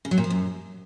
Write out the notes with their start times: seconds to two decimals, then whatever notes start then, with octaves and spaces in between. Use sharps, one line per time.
0.05 C#3
0.11 F#3
0.18 A#2
0.24 F3
0.30 F#2